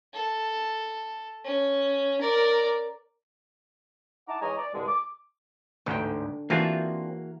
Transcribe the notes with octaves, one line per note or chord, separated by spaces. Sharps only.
A4
C#4
A#4 D5
D#4 E4 F#5 A5 A#5 D6
E3 G#3 C#5 D#5 G#5 A#5
D5
C2 G2 D3 G#3
D6
A1 D2 G#2 D3 G5
E3 A#3 C4 D4 F4 F#4 G#4 A5